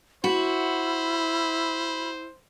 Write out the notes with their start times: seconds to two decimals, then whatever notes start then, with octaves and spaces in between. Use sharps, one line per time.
0.24 E4 F#4 C5 B5